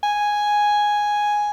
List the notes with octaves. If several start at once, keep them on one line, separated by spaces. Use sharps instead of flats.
G#5